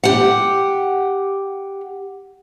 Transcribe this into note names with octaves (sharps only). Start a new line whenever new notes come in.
G4 F#5